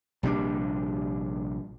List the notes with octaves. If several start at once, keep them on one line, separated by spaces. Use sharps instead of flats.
A#1 C3 G3 D4